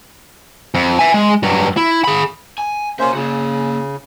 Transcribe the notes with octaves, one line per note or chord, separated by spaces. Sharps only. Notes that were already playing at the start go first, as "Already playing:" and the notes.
F2
E5 G#5
G#3
G2 F#3
E4
G#4 B5
G#5
A#3 C#4 G4 C5 E5
C#3 A#3 F#4